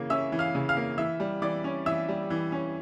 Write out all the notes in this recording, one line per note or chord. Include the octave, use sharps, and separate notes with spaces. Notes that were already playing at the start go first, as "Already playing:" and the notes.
Already playing: C#3 E3 A#3
C#4 E5 E6
E3
F5 F6
C#3
F5 F6
A#3
E3 E5 E6
G3
E3 D5 D6
C#4
E3 E5 E6
G3
E3
C#4